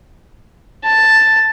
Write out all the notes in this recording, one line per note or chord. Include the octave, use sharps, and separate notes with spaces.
A5